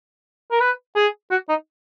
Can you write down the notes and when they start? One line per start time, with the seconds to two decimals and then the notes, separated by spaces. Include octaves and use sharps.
0.52 A#4
0.60 B4
0.96 G#4
1.31 F#4
1.49 D#4